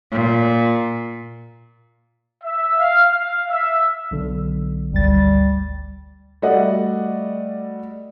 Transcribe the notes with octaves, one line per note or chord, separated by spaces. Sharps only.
A#2
E5
F5
F5
E5
B1 D3
G#1 D2 G3 A6
G3 A3 F#4 D5 D#5 F#5